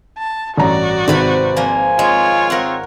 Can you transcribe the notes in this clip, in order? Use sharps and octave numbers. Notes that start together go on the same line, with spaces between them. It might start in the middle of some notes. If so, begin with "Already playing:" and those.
A5
A1 G2 F#4 D5 A#5
G#1 C3 B4 B5
F3 A#3 G#5
G#3 F4 C#5
C4 A#4 F#5